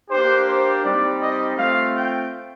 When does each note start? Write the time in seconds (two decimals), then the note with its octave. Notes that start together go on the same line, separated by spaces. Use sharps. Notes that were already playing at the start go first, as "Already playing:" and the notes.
0.10 A#3 D4 G4 C5
0.47 C5
0.84 G3 C4 D#4 D5
1.21 D#5
1.57 A3 C4 F4 F5
1.94 G5